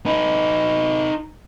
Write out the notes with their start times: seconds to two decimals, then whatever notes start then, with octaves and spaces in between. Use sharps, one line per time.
0.06 D#4 B4